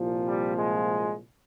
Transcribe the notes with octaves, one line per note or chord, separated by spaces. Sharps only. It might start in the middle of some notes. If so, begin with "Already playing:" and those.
Already playing: C2 A#2 F3
G3
G#3